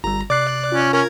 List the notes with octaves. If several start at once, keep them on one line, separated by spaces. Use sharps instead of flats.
G1 G3 A#5
C3 D5 D6 F#6 C7
C#4 F4
C#4 A#4 G#6